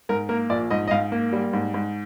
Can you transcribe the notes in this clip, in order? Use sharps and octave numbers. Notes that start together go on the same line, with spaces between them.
G#2 A#4
A#3 A#4
A#1 D5
G#2 D#5
D#5
G#2 F5
A#3
G3
G#2
G#2